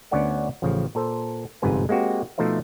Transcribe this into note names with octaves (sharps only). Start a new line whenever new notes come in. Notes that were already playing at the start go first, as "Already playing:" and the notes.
D2 B3 C#4 C#5 D5 F#5
A1 C#3 F3
A#2 A4 C5
G1 F2 G#2 C3 B4 G#5
G#3 A#3 C4 F#4 G4
B2 F3 A3 D#4 C5 E5